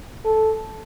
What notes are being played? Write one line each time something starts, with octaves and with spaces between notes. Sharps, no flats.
A4